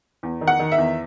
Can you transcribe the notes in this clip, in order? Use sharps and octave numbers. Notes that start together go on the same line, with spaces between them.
E2
D#3
F#5
D#3
E5
E2